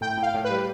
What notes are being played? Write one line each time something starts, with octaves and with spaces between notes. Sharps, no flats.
A2 G5
A2
F5
A2
B4
G3